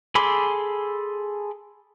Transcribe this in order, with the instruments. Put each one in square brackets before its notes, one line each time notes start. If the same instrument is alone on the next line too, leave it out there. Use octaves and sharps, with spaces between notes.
[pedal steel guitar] G#4 A4 B5 C6 D6